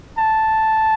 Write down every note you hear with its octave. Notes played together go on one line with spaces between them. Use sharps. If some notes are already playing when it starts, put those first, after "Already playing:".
A5